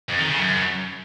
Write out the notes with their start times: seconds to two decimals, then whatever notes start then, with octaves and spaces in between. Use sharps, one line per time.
0.09 F2
0.19 D#3
0.30 C#3
0.40 F#2